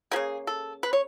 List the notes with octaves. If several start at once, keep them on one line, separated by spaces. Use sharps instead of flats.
C#3 F3 A#3 G#4
A4
B4
C#5